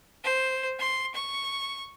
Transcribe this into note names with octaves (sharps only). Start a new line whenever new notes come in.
C5
C6
C#6